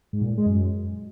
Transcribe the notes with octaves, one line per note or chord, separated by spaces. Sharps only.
G#2
A#2
A2
G#3
F#2